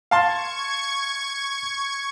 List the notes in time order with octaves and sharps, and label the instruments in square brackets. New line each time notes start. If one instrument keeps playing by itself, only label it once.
[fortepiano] F5 A5 C6 [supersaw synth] C#6 G#6